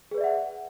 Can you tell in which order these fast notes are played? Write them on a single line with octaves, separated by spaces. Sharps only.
G#4 B4 D5 E5 F#5